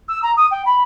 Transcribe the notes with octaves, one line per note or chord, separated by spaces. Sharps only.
E6
A#5
D#6
G5
B5